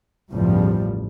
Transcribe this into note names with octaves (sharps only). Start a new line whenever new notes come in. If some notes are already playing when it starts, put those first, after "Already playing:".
A1 E2 G2 C#3 F3 G3